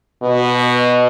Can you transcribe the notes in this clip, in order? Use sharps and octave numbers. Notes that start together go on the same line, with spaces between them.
B2